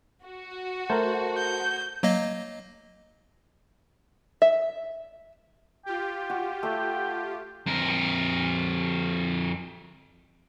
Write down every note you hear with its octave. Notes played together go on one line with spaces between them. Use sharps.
F#4
A3 A#4 C5 A5
G6
F#3 A#3 D#5
E5
F4 G4 G5
F#4
A3
F2 A#4